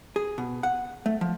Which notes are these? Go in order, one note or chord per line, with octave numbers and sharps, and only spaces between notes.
G#4
B2
F#5
A3
F3